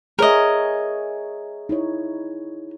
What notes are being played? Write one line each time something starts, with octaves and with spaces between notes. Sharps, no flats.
G#4 A#4 C#5 D#5 E5
D#4 E4 C#5